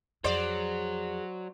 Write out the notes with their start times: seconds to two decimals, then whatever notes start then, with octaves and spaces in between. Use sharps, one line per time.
0.24 F2 F#3 G#4 C5 D5